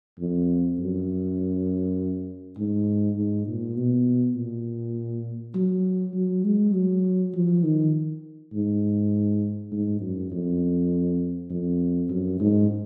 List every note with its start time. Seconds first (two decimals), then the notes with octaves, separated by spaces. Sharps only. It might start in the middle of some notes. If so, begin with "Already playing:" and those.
0.19 F2
0.79 F#2
2.57 G#2
3.16 G#2
3.47 A#2
3.77 B2
4.36 A#2
5.55 F#3
6.15 F#3
6.44 G#3
6.74 F#3
7.34 F3
7.64 D#3
8.53 G#2
9.72 G#2
10.01 F#2
10.31 F2
11.50 F2
12.10 F#2
12.40 G#2